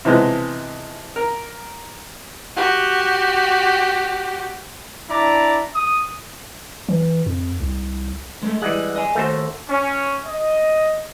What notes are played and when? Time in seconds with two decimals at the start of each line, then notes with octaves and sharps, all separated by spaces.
0.05 C3 E3 F3 G#3 B3
1.16 A#4
2.56 F#4 G4
5.10 D4 E4 D5 A#5 D6
5.74 D#6
6.89 E3
7.26 F2
7.60 C2
8.43 G#3 A3
8.62 E3 G3 G#3 F#5
8.96 D#5 G#5
9.15 D#2 A3 F#4 A#4 C5
9.69 C#4
10.25 D#5